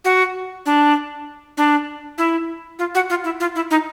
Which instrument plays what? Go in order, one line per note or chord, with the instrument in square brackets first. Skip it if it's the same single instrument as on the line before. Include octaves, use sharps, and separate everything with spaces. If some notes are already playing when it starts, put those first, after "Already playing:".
[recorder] F#4
D4
D4
E4
F4
F#4
F4
E4
F4
E4
D#4